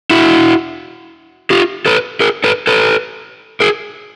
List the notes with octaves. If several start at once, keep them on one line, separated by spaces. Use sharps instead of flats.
E4 F#4
F4 G4
A4 B4
G#4 A#4
A4 B4
A4 B4
G#4 A#4